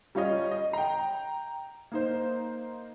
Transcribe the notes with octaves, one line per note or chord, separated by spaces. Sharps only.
G3 C#4 F4 C#5 D#5
D#5
G5 A#5
A#3 D#4 C5